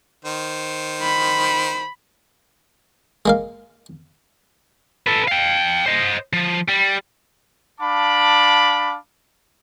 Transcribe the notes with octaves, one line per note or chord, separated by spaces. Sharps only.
D#3 C5
B5
G#3 A#3 F5
A4 B4
F5 G5
C5 D#5
F3
G3
D4 F5 A5 B5 D6